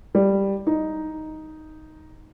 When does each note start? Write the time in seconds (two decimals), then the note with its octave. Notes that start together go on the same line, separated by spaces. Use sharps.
0.15 G3
0.67 D#4